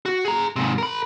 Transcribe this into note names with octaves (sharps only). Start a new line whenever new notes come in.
F#4
G#4 A#5
G#2 C3
A#4 B5